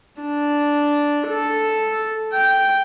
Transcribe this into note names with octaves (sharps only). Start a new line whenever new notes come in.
D4
A4
G5